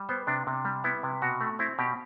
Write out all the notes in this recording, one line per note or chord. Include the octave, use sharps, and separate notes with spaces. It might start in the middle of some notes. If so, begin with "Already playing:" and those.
Already playing: G3
B3 C5
C3 D4
C3
G3
B3 E4
C3
B2 F#4
A3
C4 E4
B2 G4